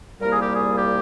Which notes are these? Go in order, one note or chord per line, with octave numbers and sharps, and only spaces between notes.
C2 A#2 G3 A#3 A#4
G#4
G4
G#4
G4